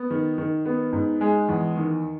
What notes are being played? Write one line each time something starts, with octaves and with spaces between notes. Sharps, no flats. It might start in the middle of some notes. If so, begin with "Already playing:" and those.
Already playing: B3
D#3
D#3
B3
G#2
G#3
E2
D#3